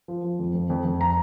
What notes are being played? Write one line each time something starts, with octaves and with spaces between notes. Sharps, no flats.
F3
F3
F2
F2
F2
F2
A#5